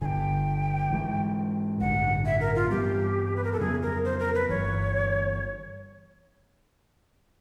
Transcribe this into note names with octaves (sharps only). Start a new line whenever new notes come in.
G1 G2 D3 G5 G#5
G#2 E3 G#3
A1 G2 D3 F#5
E5
A#4
F4
G2 E3 G3 B3 G4
B4
A#4
A4
F2 C#3 F#3 B3 G#4
A#4
C5
A#4
B4
G1 G2 E3 C#5